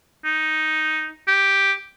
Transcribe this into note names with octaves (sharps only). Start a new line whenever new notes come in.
D#4
G4